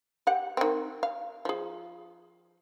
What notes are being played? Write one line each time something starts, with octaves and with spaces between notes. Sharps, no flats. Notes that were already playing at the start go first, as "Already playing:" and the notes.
G4 F#5
D#3 C4
F5
F3 G#4